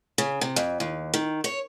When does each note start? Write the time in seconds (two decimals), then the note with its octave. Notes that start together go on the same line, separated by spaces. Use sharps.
0.18 C#3
0.41 C3
0.56 F2
0.80 D#2
1.14 D#3
1.44 C#5